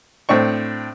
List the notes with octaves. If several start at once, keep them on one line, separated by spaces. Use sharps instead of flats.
A2 C4 D4 C#6